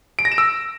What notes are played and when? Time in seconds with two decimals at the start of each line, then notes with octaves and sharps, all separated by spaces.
0.19 D7
0.25 A#6
0.32 E7
0.38 E6